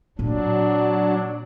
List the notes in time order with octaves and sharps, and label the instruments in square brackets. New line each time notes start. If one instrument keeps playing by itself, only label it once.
[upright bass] A#2 C4 [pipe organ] F#3 D4